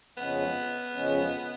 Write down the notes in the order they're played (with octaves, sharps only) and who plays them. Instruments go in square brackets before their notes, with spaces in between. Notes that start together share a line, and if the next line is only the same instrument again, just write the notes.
[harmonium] F2 C#3 F3 G#3 C#4 [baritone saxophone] B3
[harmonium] F2 C#3 F3 G#3 C#4